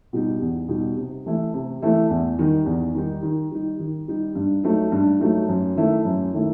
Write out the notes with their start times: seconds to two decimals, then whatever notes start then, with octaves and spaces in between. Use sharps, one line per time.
0.13 B2 G3 D#4
0.41 E2
0.68 B2 G3 D#4
0.98 C3
1.26 E3 A3 E4
1.54 C3
1.82 E3 A3 E4
2.10 E2
2.39 D#3 G3 D#4
2.66 E2
2.94 D#3 G3 D#4
3.23 D#3
3.51 G3 D#4
3.79 D#3
4.08 G3 D#4
4.35 G2
4.64 F#3 A3 D#4
4.92 G2
5.20 F#3 A3 D#4
5.48 F#2
5.76 D#3 A3 E4
6.05 F#2
6.33 D#3 A3 E4